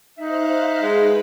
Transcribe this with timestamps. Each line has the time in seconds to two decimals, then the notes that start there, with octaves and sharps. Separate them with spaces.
0.18 D#4 C5 E5 F5 F#6
0.82 G#3 B4 B5